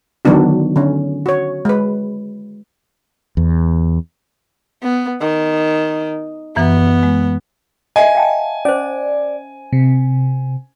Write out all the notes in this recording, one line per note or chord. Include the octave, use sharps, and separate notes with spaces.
D3 D#3 F#3 B3 D4 F#4
D3 C#4
F#4 C#5
G#3 B4
E2
B3
D#3
F#2 E3 B3
G#3
D#5 E5 G#5
F5 G5 A5
C#4 C5 D5
C3